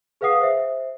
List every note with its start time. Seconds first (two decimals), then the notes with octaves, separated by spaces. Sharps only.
0.21 G#4 B4 F5 F#5 D#6 C7
0.41 C5 E5